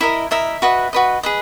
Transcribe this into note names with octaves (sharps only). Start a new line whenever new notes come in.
E4 A#4 D#5 E5
E4 A#4 D#5 E5
F#4 B4 D#5
F#4 B4 D#5
G#4 B4 D#5